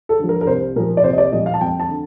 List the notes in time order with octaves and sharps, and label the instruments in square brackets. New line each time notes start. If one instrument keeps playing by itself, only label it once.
[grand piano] A4
D3 F3
A#4
A#4
C2 C5
A#2 F3 A#4
D5
C2 C5
D#5
D5
A#2 F3 D#5
F5
A5
F2 G5
A5
D3